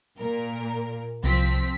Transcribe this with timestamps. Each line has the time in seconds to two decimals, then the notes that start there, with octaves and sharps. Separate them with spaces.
0.20 A#2 A#4
1.24 C2 F3 C4 B6